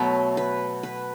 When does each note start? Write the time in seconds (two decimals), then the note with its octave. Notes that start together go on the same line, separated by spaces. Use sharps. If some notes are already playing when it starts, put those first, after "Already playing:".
Already playing: B2 F#3 A3 B4
0.37 B4
0.83 B4